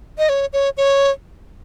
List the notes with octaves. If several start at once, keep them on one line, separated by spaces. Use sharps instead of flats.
D#5
C#5
C#5
C#5